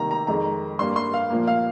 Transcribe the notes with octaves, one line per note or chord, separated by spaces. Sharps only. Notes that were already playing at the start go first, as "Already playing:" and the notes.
Already playing: C3 D#3 G3 A#3 A#5
A#5
F2 D#3 G#3 A#5
G2 G3 A#3 C6
C6
F5
A#2 F3 A#3
F5